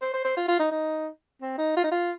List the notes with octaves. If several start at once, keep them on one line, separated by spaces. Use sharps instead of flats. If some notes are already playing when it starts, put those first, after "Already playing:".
C5
C5
C5
F4
F4
D#4
D#4
C4
D#4
F4
D#4
F4